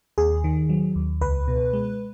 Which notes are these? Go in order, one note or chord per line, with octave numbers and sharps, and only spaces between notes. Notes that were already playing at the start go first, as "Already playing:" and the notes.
D#2 G#4
D#3
F#3
D#2
C#2 B4
B2
G#3